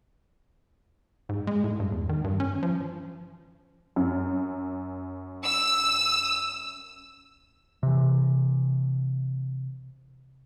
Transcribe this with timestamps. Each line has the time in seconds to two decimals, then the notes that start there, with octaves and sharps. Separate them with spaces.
1.29 G#2
1.47 G#3
1.64 A2
1.80 G2
1.92 E2
2.09 D#3
2.24 G2
2.40 C#4
2.63 F3
3.96 F#2
5.45 E6
7.83 C3 E3